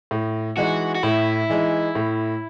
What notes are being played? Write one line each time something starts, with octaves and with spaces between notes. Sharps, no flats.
A2
E3 G#3 D#4 F#4
F#4
A2 E4
E3 G#3 D#4
A2